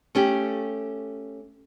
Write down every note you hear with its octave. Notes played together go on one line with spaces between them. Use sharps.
A3 C#4 G4